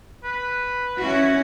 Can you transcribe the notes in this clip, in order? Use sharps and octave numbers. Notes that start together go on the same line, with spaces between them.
B4
C#4 E4 F#4